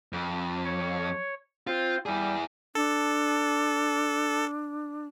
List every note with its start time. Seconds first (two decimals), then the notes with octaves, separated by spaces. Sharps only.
0.13 F2
0.65 C#5
1.67 C4 F4 C5
2.06 G3 E4 G#4
2.75 D4 A4